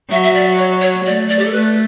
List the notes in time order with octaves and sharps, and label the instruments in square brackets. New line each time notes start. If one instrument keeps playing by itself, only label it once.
[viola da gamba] F#3 [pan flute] E5
[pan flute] E5
D5
C#5
C#5
[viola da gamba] A3 [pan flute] D5
[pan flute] D5
G4
A4
[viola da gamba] A3 [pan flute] B4